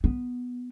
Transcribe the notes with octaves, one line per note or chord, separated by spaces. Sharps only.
B3